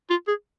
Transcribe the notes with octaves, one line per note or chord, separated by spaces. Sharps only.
F4
G#4